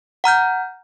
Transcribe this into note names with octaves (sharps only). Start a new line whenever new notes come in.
F#5 A#5 F6 G6